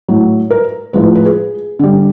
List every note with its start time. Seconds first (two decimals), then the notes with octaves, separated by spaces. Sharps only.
0.08 A2 F#3
0.50 A#4
0.93 A2 F3 G#3 B4
1.15 B4
1.25 G#4
1.79 D3 G3